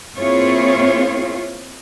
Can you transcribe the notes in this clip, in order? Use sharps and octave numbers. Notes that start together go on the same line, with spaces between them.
A#3 C4 E4 F4 G#4 C#5